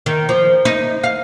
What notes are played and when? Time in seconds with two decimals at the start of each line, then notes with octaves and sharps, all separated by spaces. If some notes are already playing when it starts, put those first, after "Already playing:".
0.06 D#3
0.29 F3
0.65 D#4
1.04 F5